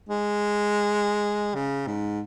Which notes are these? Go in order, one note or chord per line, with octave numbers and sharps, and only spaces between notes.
G#3
C#3
G#2